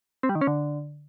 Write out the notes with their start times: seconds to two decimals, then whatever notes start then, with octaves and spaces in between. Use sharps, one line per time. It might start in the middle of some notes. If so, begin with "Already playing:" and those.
0.23 C4
0.29 G3
0.35 D#3
0.41 C#4
0.47 D3